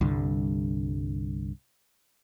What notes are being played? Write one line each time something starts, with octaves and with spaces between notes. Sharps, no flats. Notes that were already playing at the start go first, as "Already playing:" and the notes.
C2 G2 D3